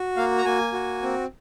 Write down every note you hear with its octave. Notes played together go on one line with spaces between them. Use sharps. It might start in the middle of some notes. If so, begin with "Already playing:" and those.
Already playing: F#4
A#3 F5
A#5
A#3 G#5
F#4
C4